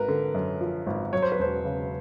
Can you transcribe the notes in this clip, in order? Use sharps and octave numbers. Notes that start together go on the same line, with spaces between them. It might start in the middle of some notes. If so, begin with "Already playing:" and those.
Already playing: G#1 A#4 B4
D3
F#2
F3
G#1
F#3 C#5
C5
B4
E1 C5
C#3